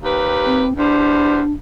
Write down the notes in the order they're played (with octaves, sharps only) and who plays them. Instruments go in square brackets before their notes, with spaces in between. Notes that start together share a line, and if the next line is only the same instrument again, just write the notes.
[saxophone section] D#2 G4 B4
[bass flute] C4
[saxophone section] E2 G3 C5 [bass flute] D4